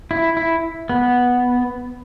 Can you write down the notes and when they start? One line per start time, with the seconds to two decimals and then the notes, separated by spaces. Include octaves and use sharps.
0.11 E4
0.37 E4
0.89 B3